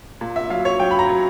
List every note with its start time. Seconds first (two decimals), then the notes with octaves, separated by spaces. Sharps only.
0.21 A#2
0.36 E5
0.50 F#3 F5
0.65 C#5
0.79 F#3 G5
0.91 B5
0.99 A#5
1.09 F#3